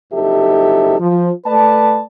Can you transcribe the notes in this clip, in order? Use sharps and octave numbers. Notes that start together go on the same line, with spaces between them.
F#1 F2 D#4 G4 A4 E5
F3
A3 B4 D5 A5